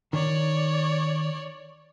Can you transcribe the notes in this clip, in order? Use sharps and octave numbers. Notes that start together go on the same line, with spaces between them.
D#3 C#5 D5